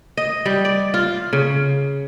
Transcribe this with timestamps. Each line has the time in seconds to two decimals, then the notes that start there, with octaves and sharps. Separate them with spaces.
0.17 D#5
0.46 G3
0.65 D5
0.94 F4
1.33 C#3